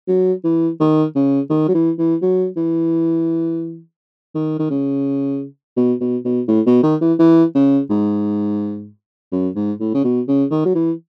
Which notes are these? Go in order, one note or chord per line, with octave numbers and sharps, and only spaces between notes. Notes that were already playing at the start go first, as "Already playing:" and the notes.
F#3
E3
D#3
C#3
D#3
F#3
E3
E3
F#3
E3
D#3
D#3
C#3
B2
B2
B2
A2
B2
D#3
E3
E3
C#3
G#2
F#2
G#2
A2
C#3
B2
C#3
D#3
F#3
E3